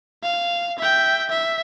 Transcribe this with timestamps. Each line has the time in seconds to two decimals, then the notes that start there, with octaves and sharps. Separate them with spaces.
0.23 F5
0.78 E5 G5
1.29 E5